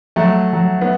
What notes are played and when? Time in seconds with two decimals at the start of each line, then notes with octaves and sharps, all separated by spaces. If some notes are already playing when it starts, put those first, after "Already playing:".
0.16 F#3 A3
0.53 F#3
0.81 B3